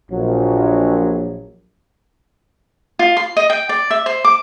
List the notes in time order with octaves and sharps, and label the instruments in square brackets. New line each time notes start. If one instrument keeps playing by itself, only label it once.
[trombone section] A#1 F#3
[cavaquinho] F4
C6
D#5
G5
D5
E5
C5
D6